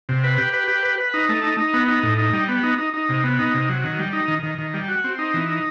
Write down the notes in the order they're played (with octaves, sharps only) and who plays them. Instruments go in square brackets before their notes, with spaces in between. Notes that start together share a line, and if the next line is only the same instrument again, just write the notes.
[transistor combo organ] C3
B4
G4
B4
G4
B4
B4
D#4
A3
D#4
D#4
B3
D#4
A2
D#4
G3
B3
D#4
D#4
D#4
C3
B3
D#4
C3
F#3
D#3
G3
D#4
D#3
D#3
D#3
G3
F#4
C4
D#4
E3
D#4